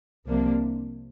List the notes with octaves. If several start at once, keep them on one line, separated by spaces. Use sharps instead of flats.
C2 C3 F3 A#3 D4